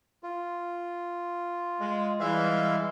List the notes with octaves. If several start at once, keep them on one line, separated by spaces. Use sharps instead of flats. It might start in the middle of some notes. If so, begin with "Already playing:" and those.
F4
G#3
E3 G3 G#3 E5 F5